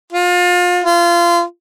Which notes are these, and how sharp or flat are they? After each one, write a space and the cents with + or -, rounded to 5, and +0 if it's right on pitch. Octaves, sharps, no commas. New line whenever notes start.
F4 +30
F4 -25